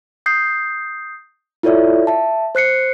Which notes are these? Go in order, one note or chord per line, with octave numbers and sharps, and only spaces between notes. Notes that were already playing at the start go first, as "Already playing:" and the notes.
D#6 G6 C7
E4 F4 A4 C#5 D5 E5
E5 A5
C5 F#6 C7 C#7